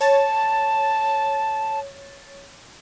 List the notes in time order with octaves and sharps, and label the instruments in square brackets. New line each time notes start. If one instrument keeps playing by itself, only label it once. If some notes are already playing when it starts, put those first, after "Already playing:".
[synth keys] C#5 A6 [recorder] A5